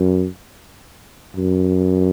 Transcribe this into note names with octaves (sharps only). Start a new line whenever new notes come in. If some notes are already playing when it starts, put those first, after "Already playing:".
Already playing: F#2
F#2